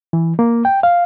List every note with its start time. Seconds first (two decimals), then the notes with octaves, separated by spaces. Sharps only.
0.13 E3
0.39 A#3
0.65 G5
0.83 F5